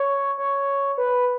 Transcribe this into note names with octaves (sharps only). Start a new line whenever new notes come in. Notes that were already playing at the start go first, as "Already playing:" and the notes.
Already playing: C#5
C#5
B4